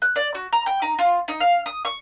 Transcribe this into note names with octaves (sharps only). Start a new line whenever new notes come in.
F#6
D5
F#4
A#5
G5
D#4
F4
D#4
F5
D#6
C#6